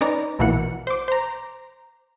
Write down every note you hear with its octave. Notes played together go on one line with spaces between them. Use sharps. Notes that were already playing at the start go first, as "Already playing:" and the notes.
C#4 D#4 B4 D5 A#5
A#1 B2 E3 A#3 F#5 C#7
C5 D6
C5 A#5